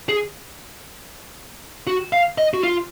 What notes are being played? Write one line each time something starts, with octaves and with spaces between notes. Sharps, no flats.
G#4
F#4
F5
D#5
F#4
F4